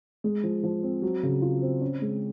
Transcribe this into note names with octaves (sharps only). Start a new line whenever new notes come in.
G#3
F3
F3
C4
F#3
C#3
F4
C4
C#4
G#3